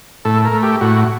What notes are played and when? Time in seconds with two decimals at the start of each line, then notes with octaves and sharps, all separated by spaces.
0.25 A2 A4
0.45 A#4
0.53 A3
0.63 G4
0.81 A2 F#4